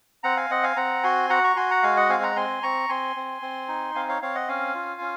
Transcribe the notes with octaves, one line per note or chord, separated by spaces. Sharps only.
C4 F#5 A#5
F5 G#5
C4 D#5 F#5
F5 G#5
C4 F#5 A#5
F#4 G#5 C6
F#4 F#5 A#5
A#5 C#6
F#4 G#5 C6
F#5 A#5
G#3 F5 G#5
D#5 F#5
C4 F5 G#5
F#5 A#5
C4 G#5 C6
C4 A#5 C#6
C4 G#5 C6
C4
C4
D#4
C4 F5 G#5
C#5 F5
C4 C#5 F5
D#5 F#5
C#4 F5 G#5
F4
C#4